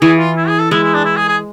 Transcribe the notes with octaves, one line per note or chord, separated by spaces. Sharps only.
E3 G#4
F4
E4
G#4
A4
G#3 E4
E4
D4
E4
G#4
G#4